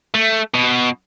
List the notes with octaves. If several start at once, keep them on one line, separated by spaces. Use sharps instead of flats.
A3
B2